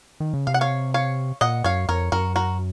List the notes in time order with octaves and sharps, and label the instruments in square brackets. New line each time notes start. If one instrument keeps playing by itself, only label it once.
[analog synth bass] D#3
C#3
[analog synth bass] C3 [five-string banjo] F5
[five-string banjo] F#5
C#5 F5
C#5 F5
[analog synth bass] A#2 [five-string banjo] D#5 F#5
[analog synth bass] F#2 [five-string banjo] C#5 F5
[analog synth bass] F2 [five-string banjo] A#4 C#5
[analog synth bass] F#2 [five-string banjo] F#4 A#4
[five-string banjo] F#4 A#4